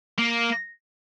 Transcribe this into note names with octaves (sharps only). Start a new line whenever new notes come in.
A#3